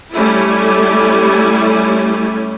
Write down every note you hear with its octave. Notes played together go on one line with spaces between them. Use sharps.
G3 A3 C#4 E4